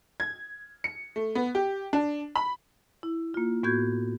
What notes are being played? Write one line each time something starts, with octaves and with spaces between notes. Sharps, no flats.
G#6
C#7
A3
B3
G4
D4
B5
E4
A#3 F4
A2 B3 F#4 G6 G#6